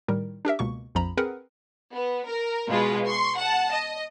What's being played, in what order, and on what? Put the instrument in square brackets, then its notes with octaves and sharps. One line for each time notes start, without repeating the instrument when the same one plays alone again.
[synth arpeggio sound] A2 D#3 G3 A#4
D4 G4 A#4 E5
C#2 B2 A#3 C#6
A#1 F2 F3 A#5 B5
C4 G#4 A#4 B4 F#5
[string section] B3
A#4
B2 G#3 F4 B4
C6 C#6
F#5 A5
D#5